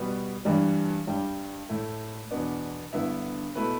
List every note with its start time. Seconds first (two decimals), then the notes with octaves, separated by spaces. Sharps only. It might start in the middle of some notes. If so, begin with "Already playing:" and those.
Already playing: B2 G3 B3
0.45 G2 E3 G3 D4
1.07 G2 G3 D4 G5
1.69 A2 A3 E4
2.31 E2 B2 B3 D4
2.93 G2 D3 B3 E4 E5
3.55 B2 A3 E4 B4